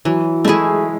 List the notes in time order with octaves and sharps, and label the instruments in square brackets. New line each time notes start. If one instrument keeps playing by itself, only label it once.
[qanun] E3 [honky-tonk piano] F#3
[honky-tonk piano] G#3 [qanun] A3 E4 G#4